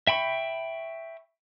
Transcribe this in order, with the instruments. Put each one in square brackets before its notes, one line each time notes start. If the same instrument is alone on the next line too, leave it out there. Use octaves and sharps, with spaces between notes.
[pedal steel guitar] E5 G5 B5 C#6